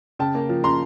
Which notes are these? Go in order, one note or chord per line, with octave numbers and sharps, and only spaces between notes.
C#3 G5 A5
A#3
F3
C#3 A#5 C6